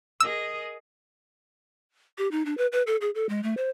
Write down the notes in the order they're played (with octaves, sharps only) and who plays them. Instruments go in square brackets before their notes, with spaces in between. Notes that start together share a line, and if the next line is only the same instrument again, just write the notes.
[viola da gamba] G#4 A#4 D#5 [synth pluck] E6
[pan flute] G4
D#4
D4
B4
B4
A4
G#4
A4
G#3
A3
C5